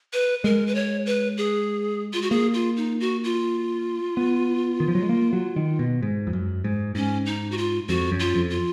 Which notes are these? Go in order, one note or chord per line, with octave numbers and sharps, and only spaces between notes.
B4
G#3 A#4
B4
C#5
B4
G#4
F4
F#4
A#3 G#4
F4
D#4
F#4
F4
B3
D#3
F3
F#3
G#3
A#3
F#3
D#3
B2
G#2
F2
F#2
G#2
G#2 C#4
D#4
F#4
F4
F2 F#4
F#2
F4
F2
F4